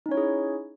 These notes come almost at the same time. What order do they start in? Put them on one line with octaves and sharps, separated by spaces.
D#4 C#4 C#5 E4 G#4